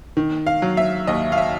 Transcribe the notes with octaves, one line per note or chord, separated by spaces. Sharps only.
D#3
F5
F#3
E5
D#2 D#5
F5
E5